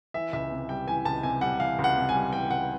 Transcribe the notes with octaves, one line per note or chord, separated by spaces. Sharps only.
E3 E5
C#2 E5
C3
G3 G5
E3 G#5
C#2 A5
C3 G#5
G3 F#5
E3 F5
C#2
F#5
C3
G#5
G3
E3 G5
C#2 F#5